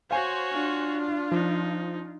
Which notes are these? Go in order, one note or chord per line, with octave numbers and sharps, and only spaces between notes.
F#4 C5 C#5 F5 G#5 C6
D4 F4
F3 D#4